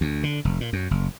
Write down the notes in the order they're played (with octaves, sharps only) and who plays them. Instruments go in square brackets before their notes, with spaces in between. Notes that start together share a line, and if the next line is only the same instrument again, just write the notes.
[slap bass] D2
D3
F1
A#2
F#2
F#1